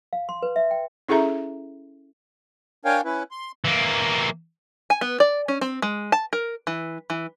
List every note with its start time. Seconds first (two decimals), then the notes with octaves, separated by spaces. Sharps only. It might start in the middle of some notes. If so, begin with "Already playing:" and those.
0.13 F5
0.29 C6
0.43 B4
0.56 E5
0.71 G5
1.09 C#4 E4 G#4 A4 E5 A#5
2.85 D4 A#4 C#5 F5 G5 G#5
3.05 C#4 E4 B4
3.31 C6
3.65 E3 A#3
4.90 G#5
5.01 B3
5.20 D5
5.48 C#4
5.61 C4
5.82 G#3
6.12 A5
6.33 A#4
6.67 E3
7.10 E3